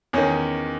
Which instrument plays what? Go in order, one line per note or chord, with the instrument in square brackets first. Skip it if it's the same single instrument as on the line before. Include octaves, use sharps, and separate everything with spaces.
[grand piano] E2 D#3 C#4